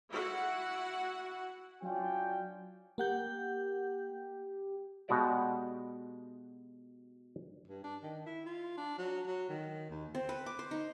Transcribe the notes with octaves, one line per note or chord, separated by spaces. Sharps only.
E4 F#4 F#5
F#3 C#4 D4 F4 G5
A#3 G4 F#5 G6
B2 G#3 F#4 G4 D5 E5
G2
D4
D#3
E4
F4
D4
F#3
F#3
D#3
D#2
C4
B4
D6
C5
D#4